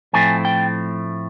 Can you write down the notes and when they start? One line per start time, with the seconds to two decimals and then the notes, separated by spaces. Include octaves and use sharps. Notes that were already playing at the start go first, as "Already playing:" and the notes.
0.13 A2 F3 A3 C4 G#5
0.45 G5